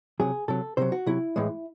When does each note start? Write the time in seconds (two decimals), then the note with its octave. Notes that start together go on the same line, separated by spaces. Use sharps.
0.20 C3 F#3 G#4
0.48 C3 F#3 A4
0.77 C3 F#3 C5
0.92 F#4
1.06 C3 F#3 E4
1.36 A2 E3 G#3